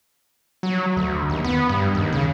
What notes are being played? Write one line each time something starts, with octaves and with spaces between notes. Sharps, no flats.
F#3
D2
D#2
B3
G2
D#2
C#3